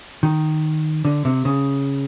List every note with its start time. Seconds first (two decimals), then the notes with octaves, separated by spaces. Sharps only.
0.23 D#3
1.05 D3
1.25 C3
1.45 C#3